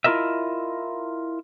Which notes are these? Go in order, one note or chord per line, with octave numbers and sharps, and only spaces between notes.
E4 F4 G#4 A#4 D#5 E5